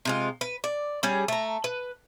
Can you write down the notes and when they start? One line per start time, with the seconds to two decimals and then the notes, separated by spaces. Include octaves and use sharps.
0.05 C3 G#3 F4
0.41 B4
0.64 D5
1.03 G3 C#4 G#4
1.28 A3 A#5
1.64 B4